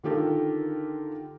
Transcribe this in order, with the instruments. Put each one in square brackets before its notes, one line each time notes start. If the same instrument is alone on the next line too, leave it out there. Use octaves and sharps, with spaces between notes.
[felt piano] D3 D#3 F4 G4 A4 A#4